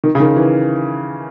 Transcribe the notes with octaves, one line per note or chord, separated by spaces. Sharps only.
D#3
C#3
D#3
E3